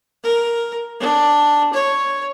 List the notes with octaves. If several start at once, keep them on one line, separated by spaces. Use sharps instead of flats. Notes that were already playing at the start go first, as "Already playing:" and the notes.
A#4
D4
C#5